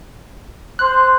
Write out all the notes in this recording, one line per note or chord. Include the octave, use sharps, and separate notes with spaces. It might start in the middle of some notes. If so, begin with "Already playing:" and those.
C5 F#6